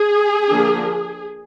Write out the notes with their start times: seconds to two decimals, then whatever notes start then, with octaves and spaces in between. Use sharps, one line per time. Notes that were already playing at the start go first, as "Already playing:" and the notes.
Already playing: G#4
0.49 D3 F3 A#3 D4